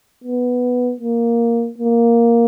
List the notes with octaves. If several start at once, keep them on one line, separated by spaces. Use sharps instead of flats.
B3
A#3
A#3